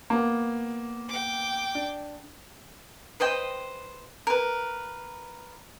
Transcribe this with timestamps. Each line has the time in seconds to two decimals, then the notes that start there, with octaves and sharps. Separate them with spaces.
0.10 A#3 B3
1.09 G5 D6
1.75 D4
3.20 B4 C5 D#5 G5
4.27 A#4 B4